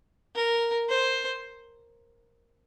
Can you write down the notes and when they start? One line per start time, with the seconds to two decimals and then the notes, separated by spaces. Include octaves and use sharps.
0.35 A#4
0.89 C5